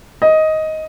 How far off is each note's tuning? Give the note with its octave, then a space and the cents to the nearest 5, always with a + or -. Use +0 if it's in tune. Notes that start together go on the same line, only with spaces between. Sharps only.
D#5 +10